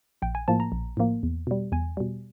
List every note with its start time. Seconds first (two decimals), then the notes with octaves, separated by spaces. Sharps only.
0.22 A#1 G5
0.35 G#5
0.48 A2 F3 A#3 A5
0.60 A#5
0.72 A#1
0.97 A2 F3 A#3
1.23 E2
1.47 B2 G3
1.72 E2 G#5
1.97 B2 G3